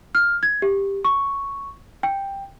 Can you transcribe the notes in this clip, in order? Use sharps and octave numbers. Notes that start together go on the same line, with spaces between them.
F6
G#6
G4
C#6
G5